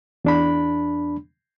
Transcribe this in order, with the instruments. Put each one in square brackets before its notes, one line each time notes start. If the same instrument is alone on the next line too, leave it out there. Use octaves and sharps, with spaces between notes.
[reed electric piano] E2 D4 B5